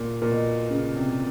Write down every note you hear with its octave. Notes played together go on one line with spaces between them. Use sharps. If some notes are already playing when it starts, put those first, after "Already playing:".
Already playing: A#2
A#2
B2
C#3
C3